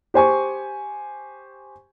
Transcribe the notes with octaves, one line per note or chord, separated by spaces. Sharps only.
G4 C5 G#5 C#6